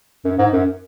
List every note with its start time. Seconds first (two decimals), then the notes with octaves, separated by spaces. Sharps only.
0.25 F#2
0.38 G#2
0.53 F#2